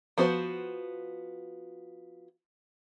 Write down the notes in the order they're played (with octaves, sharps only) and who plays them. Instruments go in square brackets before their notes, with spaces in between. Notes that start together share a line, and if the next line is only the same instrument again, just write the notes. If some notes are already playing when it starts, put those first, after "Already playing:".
[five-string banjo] F3 B3 F#4 C5